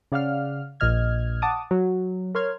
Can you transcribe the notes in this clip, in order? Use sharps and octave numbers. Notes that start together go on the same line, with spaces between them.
C#3 D5 F5 F#5 F6
A#1 A#2 D#5 F6 G#6
F#5 A5 D6 D#6
F#3
A#4 C#5 C6 F6 G#6